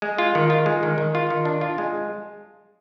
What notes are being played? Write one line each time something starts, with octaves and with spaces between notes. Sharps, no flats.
G#3
F4
D#3
F4
G#3
D#3
D#3
F4
D#3
D4
F4
G#3